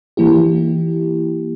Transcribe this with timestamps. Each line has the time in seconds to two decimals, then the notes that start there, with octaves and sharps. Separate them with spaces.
0.17 E3 A#3 E4 G4